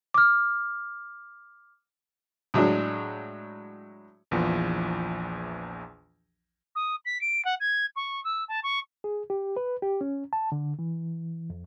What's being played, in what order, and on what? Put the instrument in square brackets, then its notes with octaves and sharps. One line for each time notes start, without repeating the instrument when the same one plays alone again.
[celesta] D6 F6
[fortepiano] A2 F#3 G#3 D4
[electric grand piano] A#1 E2 E3 F3
[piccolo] D#6
B6
D7
F#5
G#6
C#6
E6
A5
C#6
[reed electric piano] G#4
G4
B4
G4
C#4
A5
D3
E3
F2